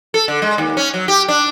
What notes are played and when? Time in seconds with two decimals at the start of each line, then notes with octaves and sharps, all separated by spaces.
0.14 A4
0.28 D3
0.42 G#3
0.58 D#2
0.77 C#4
0.94 F#3
1.08 G4
1.28 D4